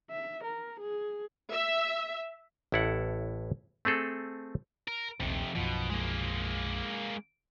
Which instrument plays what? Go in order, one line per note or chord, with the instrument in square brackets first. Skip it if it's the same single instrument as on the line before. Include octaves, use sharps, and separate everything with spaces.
[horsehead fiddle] E5
A#4
G#4
[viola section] E5
[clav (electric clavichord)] A1 A2 E4 A4 F#5
A3 C4 G#4 A4
[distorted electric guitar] A#4
[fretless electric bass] D#1 A#1 [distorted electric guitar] F2 C3
[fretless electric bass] B1 F#2 F3 [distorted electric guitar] B2
[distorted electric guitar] G#3 A#3